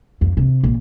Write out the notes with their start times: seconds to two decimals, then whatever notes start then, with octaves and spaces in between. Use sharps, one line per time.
0.21 F2
0.37 C3
0.63 A#1